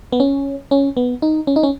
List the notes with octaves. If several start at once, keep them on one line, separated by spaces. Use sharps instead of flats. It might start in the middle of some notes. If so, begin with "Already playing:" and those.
B3
C#4
C#4
B3
D#4
C#4
D#4
C#4